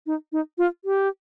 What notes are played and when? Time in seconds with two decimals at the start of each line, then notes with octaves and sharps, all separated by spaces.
0.06 D#4
0.32 D#4
0.58 F4
0.85 G4